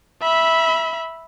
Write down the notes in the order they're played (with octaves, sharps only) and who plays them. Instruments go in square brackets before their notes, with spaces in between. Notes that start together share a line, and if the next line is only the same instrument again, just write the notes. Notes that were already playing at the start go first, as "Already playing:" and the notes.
[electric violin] E5 B5